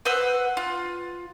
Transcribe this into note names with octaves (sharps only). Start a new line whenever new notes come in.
B4 C5 F#5 E6
F4